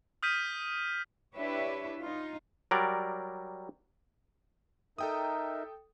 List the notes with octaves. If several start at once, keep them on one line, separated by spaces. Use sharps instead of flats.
D#6 F6 G6 B6 D#7
D4 E4 G4 B4 C#5 E5
D#4 F4
F#3 G3 A#4 D5
D#4 A4 A#4 E5 G5 D#6